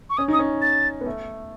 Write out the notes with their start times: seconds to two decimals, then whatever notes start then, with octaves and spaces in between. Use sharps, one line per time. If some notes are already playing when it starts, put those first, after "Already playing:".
0.10 C#6
0.17 C#4 D#6
0.28 D#4 D#6
0.39 C#4
0.62 A6
1.01 B3
1.06 A3